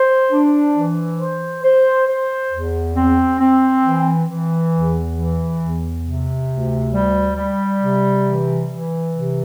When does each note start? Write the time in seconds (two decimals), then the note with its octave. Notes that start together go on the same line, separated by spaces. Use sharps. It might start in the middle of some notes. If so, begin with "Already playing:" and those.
Already playing: C5
0.31 D4
0.75 E3
1.19 C5
1.64 C5
2.08 C5
2.51 E2
2.96 C4
3.40 C4
3.84 E3
4.28 E3
4.72 E2
5.16 E3
5.60 E2
6.04 C3
6.48 D2
6.93 G3
7.36 G3
7.80 C3
8.24 E3
8.68 E3
9.12 C3